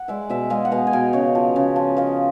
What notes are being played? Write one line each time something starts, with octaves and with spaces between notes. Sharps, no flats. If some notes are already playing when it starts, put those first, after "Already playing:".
Already playing: F#5
G#3 D5 E5
B2 D5 E5
G#3 D#5 F5
F#5
B2 D#5 F5
G#5
B2 F5 G5
C#3 C#5 D#5
F3
C#3
F3
F3 D#5 F5